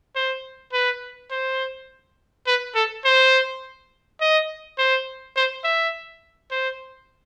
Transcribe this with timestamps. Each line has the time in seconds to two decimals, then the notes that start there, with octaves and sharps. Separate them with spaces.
0.16 C5
0.73 B4
1.31 C5
2.47 B4
2.75 A4
3.05 C5
4.21 D#5
4.78 C5
5.36 C5
5.64 E5
6.51 C5